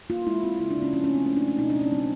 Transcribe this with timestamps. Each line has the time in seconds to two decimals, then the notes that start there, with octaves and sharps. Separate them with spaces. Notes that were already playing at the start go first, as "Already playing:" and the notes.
0.10 A#3 F4
0.26 G#3 E4
0.43 C4 F4
0.59 C#3 E4
0.71 D4
0.77 C#3
0.82 C#4
0.93 F3 C#4
1.04 C#4
1.09 A3
1.15 C4
1.26 A3 C#4
1.36 D4
1.42 A3
1.48 D4
1.59 B2 D#4
1.70 D4
1.75 C4
1.81 C#4
1.92 F#3 C4